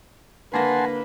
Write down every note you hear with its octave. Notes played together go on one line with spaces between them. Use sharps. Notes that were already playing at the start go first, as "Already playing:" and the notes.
D3 A#3 B4 F#5 G#5 A5 C6 A#6